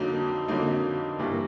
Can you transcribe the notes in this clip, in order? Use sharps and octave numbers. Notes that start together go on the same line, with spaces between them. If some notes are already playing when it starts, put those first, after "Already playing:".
Already playing: F2 D3 F#3 A#3 D#4
F2 D3 F#3 A#3 D#4
G2 E3 G3 A#3